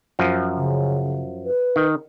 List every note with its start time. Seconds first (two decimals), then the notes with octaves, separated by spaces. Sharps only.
0.19 F#2 F3
0.56 C#3
1.45 B4
1.76 D#3